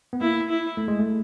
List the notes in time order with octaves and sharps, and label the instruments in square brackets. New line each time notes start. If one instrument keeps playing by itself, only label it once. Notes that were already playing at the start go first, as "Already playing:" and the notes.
[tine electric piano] B3
[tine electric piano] A#3 [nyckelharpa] E4
[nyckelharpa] E4
[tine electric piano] A3
G#3
A3